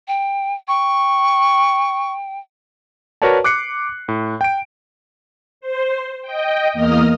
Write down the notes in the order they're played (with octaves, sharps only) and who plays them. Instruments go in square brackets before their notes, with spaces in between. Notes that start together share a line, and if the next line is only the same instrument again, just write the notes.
[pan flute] G5
[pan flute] G5 [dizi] C#6
[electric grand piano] F#4 A#4 B4 C#5 D5 A5
D6 F#6 C7 C#7
A2
G5 D7
[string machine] C5
D#5 G5
E2 A#3 D#5 D#6 F6